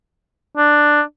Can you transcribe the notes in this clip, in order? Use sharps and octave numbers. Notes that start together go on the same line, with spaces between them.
D4